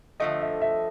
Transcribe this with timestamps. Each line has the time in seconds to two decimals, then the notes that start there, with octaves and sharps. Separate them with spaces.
0.20 D3 F3 A3 D#5
0.42 E5
0.62 E5